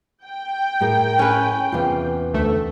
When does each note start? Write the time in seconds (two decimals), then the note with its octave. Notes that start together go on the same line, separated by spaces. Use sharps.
0.24 G5
0.80 A2 G#4 A#4
1.19 C#4 B4
1.72 E2 C3 F4
2.34 D2 A3